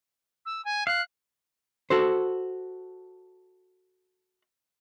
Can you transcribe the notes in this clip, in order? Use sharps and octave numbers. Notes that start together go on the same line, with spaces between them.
E6
G#5
F5 F#6
F#4 A4 C5